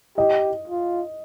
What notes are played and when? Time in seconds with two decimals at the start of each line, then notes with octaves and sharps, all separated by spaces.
0.17 G4 D#5
0.68 F4